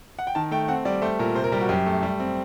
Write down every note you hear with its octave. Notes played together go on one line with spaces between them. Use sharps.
F#5
G5
D#3 A5
A3 G5
C4 F#5
G3 D5
A3 C5
A#2 A#4
C3 C5
A#4
G3 G4
F#4
F#2 G4
A3
G3
C4